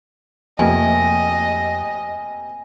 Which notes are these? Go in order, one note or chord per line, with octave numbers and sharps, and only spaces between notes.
F2 C3 A3 A#3 D#5 G#5